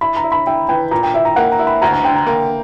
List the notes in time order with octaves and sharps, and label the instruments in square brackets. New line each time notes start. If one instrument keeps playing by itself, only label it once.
[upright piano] E4 [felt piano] B5
[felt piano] A#5
[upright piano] E4
[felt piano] B5
[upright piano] E4 [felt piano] G5
[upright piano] E3 [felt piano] G5
[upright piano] A#2 [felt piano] A#5
[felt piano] G5
[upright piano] E4 [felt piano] E5
[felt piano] A#5
[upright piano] A#3 [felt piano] F#5
[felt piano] A#5
[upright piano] E4
[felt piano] B5
[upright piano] D2 [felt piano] A#5
[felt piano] A#5
[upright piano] D3 [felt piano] G5
[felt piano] A#5
[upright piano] A#3 [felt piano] A#5